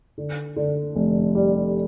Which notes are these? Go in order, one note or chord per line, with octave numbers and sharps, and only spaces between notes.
D3
D3
F1
G3